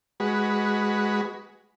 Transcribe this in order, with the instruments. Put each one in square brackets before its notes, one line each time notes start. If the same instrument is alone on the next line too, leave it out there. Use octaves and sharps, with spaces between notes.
[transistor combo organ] G#3 F#4 B4